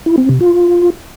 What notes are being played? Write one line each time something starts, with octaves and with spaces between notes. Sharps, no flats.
E4
C4
C3
F4